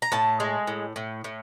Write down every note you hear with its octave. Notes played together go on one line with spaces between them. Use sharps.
A#5
A2 A5
G#3
A2
A2
A2